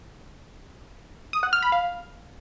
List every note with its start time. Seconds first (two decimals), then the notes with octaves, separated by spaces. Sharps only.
1.33 D#6
1.43 F#5
1.53 F6
1.63 B5
1.72 F5